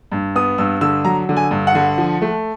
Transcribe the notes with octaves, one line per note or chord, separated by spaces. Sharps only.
G2
B3 D#6
G2 E6
D3 E6
F#3 A#5
D3
G#5
G2
F#5
D3
F3
A3